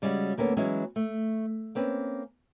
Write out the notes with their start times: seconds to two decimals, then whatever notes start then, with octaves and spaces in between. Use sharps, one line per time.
0.02 C#3 G3 G#3 C#4 F4 F#4
0.37 D2 A#3 B3 C#4 A4
0.57 E3 F#3 G#3 C#4 E4
0.96 A3
1.75 A#3 C4 C#4 B4